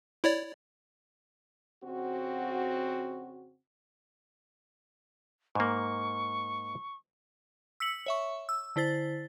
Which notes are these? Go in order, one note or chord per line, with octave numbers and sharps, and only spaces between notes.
E4 C#5 D5
F2 C#3 C4 F#4
G#2 A#3 C#6
E6 B6 C#7 F#7
C#5 E5 C#6
E6
D3 E4 C5 A6